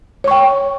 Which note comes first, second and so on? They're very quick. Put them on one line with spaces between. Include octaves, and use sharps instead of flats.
C#5 C#6 G5